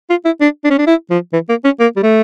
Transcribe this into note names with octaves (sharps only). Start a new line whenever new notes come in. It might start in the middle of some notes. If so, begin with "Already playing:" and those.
F4
E4
D4
D4
C#4
D4
E4
F3
E3
A#3
C#4
A#3
G3
A3